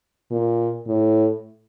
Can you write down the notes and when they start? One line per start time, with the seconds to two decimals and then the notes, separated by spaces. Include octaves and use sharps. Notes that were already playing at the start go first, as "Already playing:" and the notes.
0.31 A#2
0.87 A2